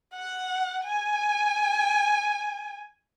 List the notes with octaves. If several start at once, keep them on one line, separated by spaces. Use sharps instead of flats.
F#5
G#5